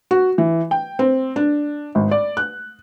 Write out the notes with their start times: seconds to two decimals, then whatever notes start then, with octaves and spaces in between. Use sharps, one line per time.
0.11 F#4
0.38 E3
0.71 G5
0.99 C4
1.36 D4
1.95 G#1
2.11 D5
2.37 F#6